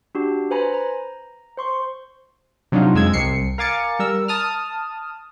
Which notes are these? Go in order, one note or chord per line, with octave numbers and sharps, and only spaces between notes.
D4 F#4 G4
B4 C5 G#5 A#5 B5
A#5
C5 C6 C#6
C3 F#3 D4 D#4 F4
F2 G#3 E6 G#6
C2 C7 C#7
A#4 F5 G#5 D6 A6 C#7
G3 A#4 E6
A5 D#6 F6